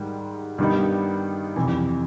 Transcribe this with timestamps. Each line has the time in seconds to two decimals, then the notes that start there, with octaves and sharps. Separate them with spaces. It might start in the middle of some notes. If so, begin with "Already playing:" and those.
Already playing: G#2 D#3 G3
0.58 G2 D#3 G3 B3 D#4
1.56 F2 C3 E3